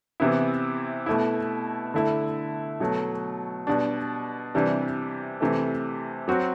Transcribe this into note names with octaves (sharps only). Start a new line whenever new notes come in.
C3 E3 B3 E4
B2 A3 E4
D3 A3 E4
B2 F#3 A3
B2 G3 D4
C3 E3 G3 D4
C3 E3 A3
F#3 C4 F#4